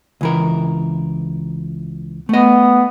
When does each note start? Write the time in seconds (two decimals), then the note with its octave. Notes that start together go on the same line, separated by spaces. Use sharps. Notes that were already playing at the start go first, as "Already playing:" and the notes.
0.21 C#2 E3 A#4
2.29 A3 B3 D#5